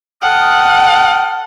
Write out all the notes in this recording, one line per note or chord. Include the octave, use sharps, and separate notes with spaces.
A4 F#5 G5 D#6 F6